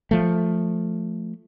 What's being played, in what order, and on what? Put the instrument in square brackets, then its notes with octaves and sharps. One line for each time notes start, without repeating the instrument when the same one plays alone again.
[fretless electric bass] F3 A3